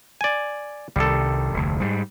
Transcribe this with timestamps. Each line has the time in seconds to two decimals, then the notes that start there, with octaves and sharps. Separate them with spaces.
0.21 D5 G#5
0.96 C2 C3 D#3 G3 A4
1.54 F1 D2
1.81 G#2 G3